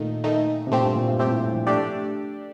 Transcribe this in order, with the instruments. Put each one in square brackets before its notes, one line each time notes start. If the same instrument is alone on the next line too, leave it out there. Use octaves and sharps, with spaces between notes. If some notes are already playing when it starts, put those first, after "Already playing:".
Already playing: [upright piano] A#2 [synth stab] D#3 A3 D#4
[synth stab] D#3 A3 D#4
[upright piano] C3
[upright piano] A#2 [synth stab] A3 C4 G4
[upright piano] G2
A#2
G2
[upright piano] G2 [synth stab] A3 C4 G4
[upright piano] A2
F3
[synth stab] A3 D4 G4 D5